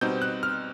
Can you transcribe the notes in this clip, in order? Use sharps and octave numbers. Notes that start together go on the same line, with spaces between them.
B2 G3 C4 D#4 G6
F#6
F6